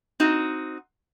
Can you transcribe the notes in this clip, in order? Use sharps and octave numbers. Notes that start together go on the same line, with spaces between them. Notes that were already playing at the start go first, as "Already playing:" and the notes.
C4 D#4 F#4